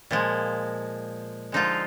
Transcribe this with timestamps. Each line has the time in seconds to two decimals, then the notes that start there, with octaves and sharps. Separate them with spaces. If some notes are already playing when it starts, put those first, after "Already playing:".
0.11 A#2 F3 G#3
1.52 D3 F3 G#3 D#4 F4